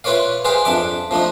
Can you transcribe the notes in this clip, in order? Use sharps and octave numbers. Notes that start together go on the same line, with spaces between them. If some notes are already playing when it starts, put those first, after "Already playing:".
E4 F4 B4 C#5 D5 F5
G4 G#4 B4 C5 D5 F5
F2 D4 E5 D6
F3 A3 D4 D#4